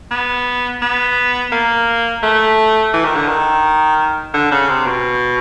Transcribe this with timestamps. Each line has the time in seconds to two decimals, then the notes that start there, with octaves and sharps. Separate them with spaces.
0.11 B3
0.82 B3
1.52 A#3
2.23 A3
2.93 E3
3.05 D#3
3.16 D3
3.28 D#3
4.34 D3
4.51 C#3
4.69 C3
4.86 B2